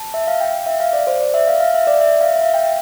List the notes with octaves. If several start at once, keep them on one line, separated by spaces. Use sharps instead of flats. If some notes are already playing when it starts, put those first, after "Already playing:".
Already playing: A5
E5
F5
G5
F5
E5
F5
D5
C5
D5
E5
F5
F5
E5
D5
E5
F5
E5
F5
G5